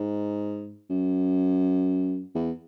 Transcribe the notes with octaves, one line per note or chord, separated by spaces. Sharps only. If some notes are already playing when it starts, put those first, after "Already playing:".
Already playing: G#2
F#2
E2